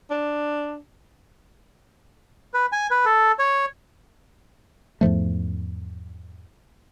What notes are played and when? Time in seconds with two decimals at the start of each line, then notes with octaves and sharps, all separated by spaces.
0.10 D4
2.54 B4
2.72 G#5
2.91 B4
3.05 A4
3.39 C#5
5.01 E2 G#2 F3 A3